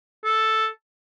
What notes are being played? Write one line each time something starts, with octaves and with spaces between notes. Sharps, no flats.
A4